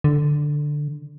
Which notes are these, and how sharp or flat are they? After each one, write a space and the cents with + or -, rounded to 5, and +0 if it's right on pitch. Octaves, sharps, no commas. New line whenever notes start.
D3 +5